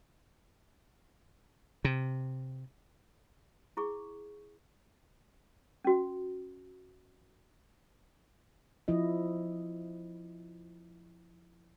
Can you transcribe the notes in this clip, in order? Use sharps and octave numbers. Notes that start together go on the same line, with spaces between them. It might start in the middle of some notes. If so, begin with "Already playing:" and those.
C3
E4 G#4 C#6
C#4 F#4
F3 E4 D#5